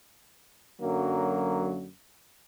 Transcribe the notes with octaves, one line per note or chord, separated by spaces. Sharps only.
F#2 D3 F#3 A#3